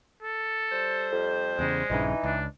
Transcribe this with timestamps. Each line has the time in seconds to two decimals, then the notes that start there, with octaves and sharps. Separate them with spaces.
0.23 A4
0.71 G3 C5
1.12 F2
1.59 E2 C#3 G#3
1.90 A#1 G2 C#3 E3 D#4
2.23 C#2 D4